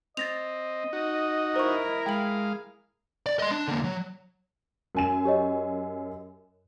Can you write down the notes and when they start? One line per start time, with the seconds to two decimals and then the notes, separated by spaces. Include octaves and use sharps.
0.17 C4 D#5 A6 A#6 F7
0.93 D#4 F#4
1.56 E4 A#4 C5 C#6
2.06 G#3 F5 G5 F#7
3.26 D5
3.39 D#5 C6
3.52 D4
3.68 D3 A#3
3.84 F#3
4.95 F#2 G#5 E7
5.25 G4 C#5 D#5